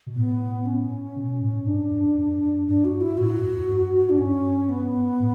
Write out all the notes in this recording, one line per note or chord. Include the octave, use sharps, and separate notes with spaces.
B2
A2 B3
C#4
B2
A2
G2 D4
F#2
F#2
G2 D4
F#4
E4
A2 F#4
F#2
F#2
G2
D4
G2 C#4
B3
A2